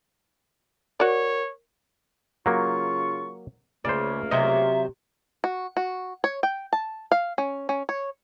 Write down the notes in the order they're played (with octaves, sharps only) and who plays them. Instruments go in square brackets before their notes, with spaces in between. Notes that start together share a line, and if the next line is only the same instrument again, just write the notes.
[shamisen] F#4 D5 [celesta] A#4 [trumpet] C#5
[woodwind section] C#3 F4 C#6 [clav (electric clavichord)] F#3 A#3
[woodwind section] C#2 A3 A#3 [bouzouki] C#3 [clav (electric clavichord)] C5 D5
[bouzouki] C3 F#3 C5 [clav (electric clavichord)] D#5 [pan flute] E5
[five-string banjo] F#4
F#4
C#5
G5
A5
F5
C#4
C#4
C#5